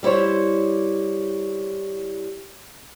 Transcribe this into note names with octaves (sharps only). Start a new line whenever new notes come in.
G3 E4 C5 C#5